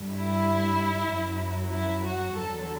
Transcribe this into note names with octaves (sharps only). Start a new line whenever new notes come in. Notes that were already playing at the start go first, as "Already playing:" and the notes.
Already playing: G2 D3 G3
E4
F#2 F#3
E4
F#4
E2 D3 F#3 A4